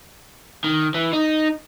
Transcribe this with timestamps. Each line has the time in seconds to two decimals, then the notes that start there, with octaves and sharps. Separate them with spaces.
0.64 D#3
0.95 E3
1.13 D#4